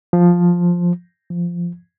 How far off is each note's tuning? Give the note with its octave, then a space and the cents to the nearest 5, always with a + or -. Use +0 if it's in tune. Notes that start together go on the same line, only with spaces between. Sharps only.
F3 +5
F3 -10